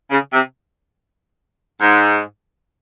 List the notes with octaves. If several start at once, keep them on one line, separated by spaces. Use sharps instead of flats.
C#3
C3
G#2